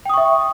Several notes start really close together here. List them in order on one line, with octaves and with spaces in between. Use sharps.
G5 D#6 C#6 E5